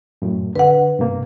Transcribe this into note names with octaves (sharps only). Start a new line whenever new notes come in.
F#2 A2
D3 B4 F#5
G2 C3 A#3